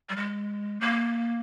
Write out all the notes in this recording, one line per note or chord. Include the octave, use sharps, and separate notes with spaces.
G3
G#3
A#3